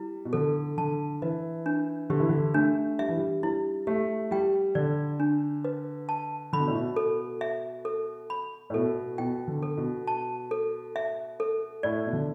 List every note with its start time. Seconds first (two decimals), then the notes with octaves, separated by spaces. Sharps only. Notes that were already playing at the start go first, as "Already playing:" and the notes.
Already playing: G3 E4
0.25 B2
0.33 D3 A4
0.78 D3 A5
1.22 E3 B4
1.66 D4
2.10 D3 G4
2.20 E3
2.29 D3
2.54 A3 D4
2.99 G3 E5
3.09 E3
3.17 G3
3.43 G3 E4
3.87 A3 G4
4.31 G3 G5
4.75 D3 D5
5.20 D4
5.65 B4
6.09 A5
6.53 D3 B5
6.60 B2
6.68 A2
6.75 B2
6.96 A4
7.41 E5
7.85 A4
8.30 B5
8.70 A2
8.74 B2 A4
9.18 B2 G5
9.47 D3
9.63 A4
9.77 B2
10.07 A5
10.51 A4
10.96 E5
11.40 A4
11.83 A2 D5
12.06 B2
12.13 D3